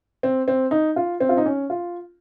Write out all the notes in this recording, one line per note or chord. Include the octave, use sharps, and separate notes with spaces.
C4
C4
D#4
F4
C4
F4
D#4
C#4
F4